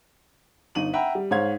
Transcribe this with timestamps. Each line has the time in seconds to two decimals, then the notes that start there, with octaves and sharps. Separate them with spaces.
0.75 G1 D#4 D#7 F#7
0.93 E5 F#5 G5 A#5 B5
1.15 G3
1.31 G#2 C5 C#5 F5 G#6